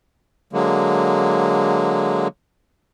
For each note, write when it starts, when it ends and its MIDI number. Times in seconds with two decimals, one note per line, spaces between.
0.53 2.28 50
0.53 2.28 54
0.53 2.28 56
0.53 2.28 58